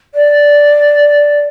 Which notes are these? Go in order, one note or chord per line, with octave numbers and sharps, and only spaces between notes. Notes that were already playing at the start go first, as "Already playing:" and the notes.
D5